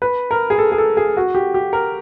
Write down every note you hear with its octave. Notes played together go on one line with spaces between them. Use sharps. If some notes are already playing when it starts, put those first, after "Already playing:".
B4
A#4
G#4
A4
G#4
A4
G#4
F#4
G4
G4
A#4